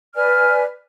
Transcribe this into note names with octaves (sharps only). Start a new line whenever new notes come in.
B4 D5 G#5 F6